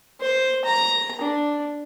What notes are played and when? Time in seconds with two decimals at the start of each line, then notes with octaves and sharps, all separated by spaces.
0.21 C5
0.65 A#5
1.21 D4